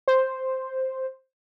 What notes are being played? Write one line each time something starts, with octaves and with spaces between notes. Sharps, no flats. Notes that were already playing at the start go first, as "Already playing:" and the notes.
C5